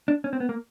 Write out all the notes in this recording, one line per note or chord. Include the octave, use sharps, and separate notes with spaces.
D4
C#4
C4
B3
A#3